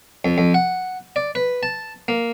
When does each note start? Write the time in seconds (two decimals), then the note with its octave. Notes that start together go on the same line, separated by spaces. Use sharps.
0.25 F2
0.38 F2
0.54 F#5
1.16 D5
1.35 B4
1.63 A5
2.08 A#3